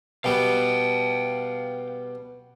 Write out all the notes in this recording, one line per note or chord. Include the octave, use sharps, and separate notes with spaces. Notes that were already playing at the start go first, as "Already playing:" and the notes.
B2 G3 B3 F5 G5